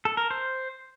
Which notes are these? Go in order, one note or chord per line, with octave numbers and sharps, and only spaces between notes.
A4
A#4
C5